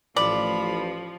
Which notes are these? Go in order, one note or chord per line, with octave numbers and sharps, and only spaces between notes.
A1 F3 D5 B5